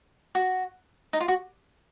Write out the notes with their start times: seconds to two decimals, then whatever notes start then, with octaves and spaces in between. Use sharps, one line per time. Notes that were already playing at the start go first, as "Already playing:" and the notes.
0.35 F#4
1.13 D#4
1.20 F4
1.28 F#4